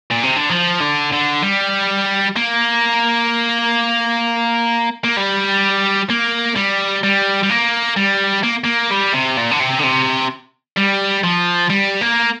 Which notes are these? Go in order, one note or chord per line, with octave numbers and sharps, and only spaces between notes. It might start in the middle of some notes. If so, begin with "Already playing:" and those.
A#2
C3
D3
F3
D3
D3
G3
A#3
A#3
G3
A#3
G3
G3
G3
A#3
G3
A#3
A#3
G3
C3
A#2
D3
C3
D3
C3
G3
F3
G3
A#3